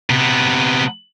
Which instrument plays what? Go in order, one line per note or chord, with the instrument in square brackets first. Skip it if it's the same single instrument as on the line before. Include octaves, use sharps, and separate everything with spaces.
[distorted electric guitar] C3 B3